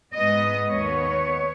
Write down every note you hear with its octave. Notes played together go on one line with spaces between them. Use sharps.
G#2 G#3 B3 D#5
D#2 D#3 B3 C#5